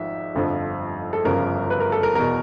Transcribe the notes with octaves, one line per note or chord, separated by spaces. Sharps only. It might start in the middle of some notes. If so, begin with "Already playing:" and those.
Already playing: G#1 G#2 F3 E5
G1 F2 D3 F3
A4
G1 F#2 C#3 F3 A#4
B4
A#4
A4
A#4
E2 B2 A#4